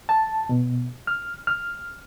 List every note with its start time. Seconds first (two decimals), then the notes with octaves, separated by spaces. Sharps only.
0.09 A5
0.49 B2
1.07 F6
1.47 F6